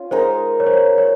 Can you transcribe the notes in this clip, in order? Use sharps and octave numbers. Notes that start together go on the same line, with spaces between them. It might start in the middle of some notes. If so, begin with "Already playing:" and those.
Already playing: C#4 F4
G#3 D#4 A#4 C5
C#5
C5
C#5
C#5